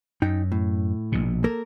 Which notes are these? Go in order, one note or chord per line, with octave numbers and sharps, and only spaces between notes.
F#2 D#4 G5
A2
A#1 B2
A#3 A4 A#4